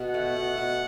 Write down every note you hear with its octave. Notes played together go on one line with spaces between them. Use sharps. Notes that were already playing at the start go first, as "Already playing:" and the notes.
Already playing: B2 F#5
A3
B2
B2